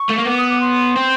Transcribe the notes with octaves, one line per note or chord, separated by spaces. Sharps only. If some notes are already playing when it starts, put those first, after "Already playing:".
Already playing: C#6
A3
A#3
B3 D6
D#6
D6
C6
C4